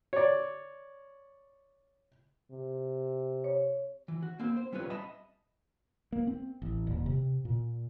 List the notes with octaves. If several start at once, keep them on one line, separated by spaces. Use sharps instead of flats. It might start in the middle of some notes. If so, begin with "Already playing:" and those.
C#5 D5
C3
C#5
E3
F#4
A#3 C4 C5
C5
G3 C4 C#4 F4 B4
D#5 E5 A5 B5
A#3
C4
A1
D#1
C3
A#2